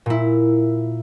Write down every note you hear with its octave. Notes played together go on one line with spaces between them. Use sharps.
A#2 E4